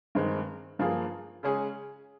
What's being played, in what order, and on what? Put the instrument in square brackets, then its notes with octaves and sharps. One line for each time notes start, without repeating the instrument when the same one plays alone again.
[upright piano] G2 D#3 G#3 C4 D#4
G2 F3 A#3 F4 G#4
C#3 G#3 C#4 G#4